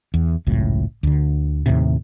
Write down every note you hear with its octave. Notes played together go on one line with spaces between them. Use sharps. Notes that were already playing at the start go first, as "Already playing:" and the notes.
E2
G#1 C#2 F#2 A2
D2 D3
D#2 A2 C3